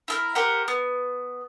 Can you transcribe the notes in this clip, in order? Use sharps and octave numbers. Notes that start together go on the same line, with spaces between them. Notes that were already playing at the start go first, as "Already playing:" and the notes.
E4 A4 A#4
G4 A#4 C5 F#5
B3